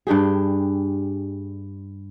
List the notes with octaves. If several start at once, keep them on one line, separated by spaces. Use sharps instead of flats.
G2 D4 G4 G#4